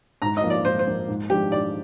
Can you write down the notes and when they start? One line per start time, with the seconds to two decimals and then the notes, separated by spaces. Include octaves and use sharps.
0.22 G#2 A#5
0.37 D#5
0.44 F3 A#3 F4
0.50 D5
0.65 G#2 C5
0.79 C5
0.87 F3 A#3 F4
1.08 G#2
1.30 F3 G#3 D4 G4
1.52 G#2 D5